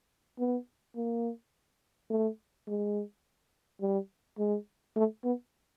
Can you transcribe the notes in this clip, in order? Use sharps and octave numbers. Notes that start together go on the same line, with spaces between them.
B3
A#3
A3
G#3
G3
G#3
A3
B3